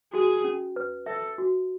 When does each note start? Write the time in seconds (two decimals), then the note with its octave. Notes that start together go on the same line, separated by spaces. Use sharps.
0.13 F#4 G#4
0.44 C#4
0.76 B4
1.06 A4 E5
1.38 F#4